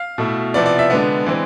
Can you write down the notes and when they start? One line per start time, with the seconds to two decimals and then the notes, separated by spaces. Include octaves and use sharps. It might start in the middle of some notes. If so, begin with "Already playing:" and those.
Already playing: F5
0.18 B2 A3 E4
0.54 C3 F3 B3 E4 D5
0.66 D5
0.79 E5
0.90 D3 G#3 B3 D5
1.26 E3 G#3 C4